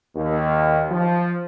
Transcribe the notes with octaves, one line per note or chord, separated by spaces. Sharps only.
D#2
F3